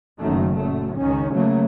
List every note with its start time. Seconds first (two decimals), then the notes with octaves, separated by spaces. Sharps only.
0.20 F#1 F#2 D#3 A3
0.55 F#2 A#2 A3
0.96 C#2 D#3 C#4
1.33 C#3 F#3 A3 A#3